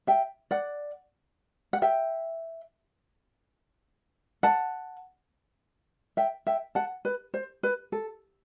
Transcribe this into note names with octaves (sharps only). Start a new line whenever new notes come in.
E5 G5
D5 F#5
F#5
E5 G5
F#5 A5
E5 G5
E5 G5
F#5 A5
B4
C5
B4
A4